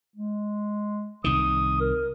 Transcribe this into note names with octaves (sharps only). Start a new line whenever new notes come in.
G#3
C2 D#3 D#6
A#4